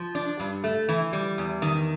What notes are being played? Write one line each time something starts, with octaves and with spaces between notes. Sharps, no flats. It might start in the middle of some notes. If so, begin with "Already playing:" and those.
Already playing: F3
D4
G2
A3
E3
G3
E2
D#3